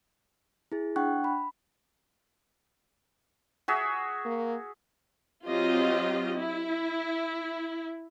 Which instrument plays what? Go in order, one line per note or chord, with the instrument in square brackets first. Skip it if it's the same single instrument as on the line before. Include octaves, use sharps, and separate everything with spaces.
[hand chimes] E4 G#4
D4 F#5 G5 C#6 F#6
B5
[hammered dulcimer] F#4 G#4 E5
[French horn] A#3
[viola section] F#3 C4 F4 G4 D#5
E4